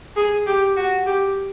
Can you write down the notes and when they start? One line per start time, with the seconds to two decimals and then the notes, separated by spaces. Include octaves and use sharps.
0.16 G#4
0.47 G4
0.76 F#4
1.06 G4